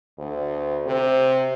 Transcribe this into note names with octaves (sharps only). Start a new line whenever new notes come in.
D2
C3